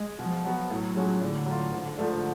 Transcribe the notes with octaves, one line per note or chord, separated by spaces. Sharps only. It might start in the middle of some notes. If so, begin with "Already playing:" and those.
Already playing: G#3
B2 F3
F#3 B3 F#4
A2 F#3
F3 G#3 C#4 F#4
A2 D3
F#3 A3 F4
G#1 D3
G#2 F3 A3 D4